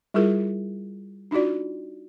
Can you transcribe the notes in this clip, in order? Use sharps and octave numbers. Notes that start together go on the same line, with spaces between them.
G3 E4 F4 G#4 A#4
D4 D#4 F4 F#4 D5